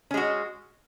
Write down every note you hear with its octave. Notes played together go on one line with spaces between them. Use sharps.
G#3 C#4 F#4